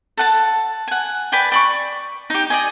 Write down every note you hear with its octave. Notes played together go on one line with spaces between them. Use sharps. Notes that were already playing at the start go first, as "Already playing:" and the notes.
A4 F#5 A5
F#5 G#5
B4 D5 G5 G#5
D5 B5 C#6
D#4 G4
D5 D#5 G#5